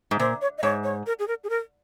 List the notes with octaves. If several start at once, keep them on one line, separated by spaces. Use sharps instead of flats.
G#2
A#2 C5
C#5
D#5
G#2 C#5
C#5
A#4
G#4
A#4
G#4
A#4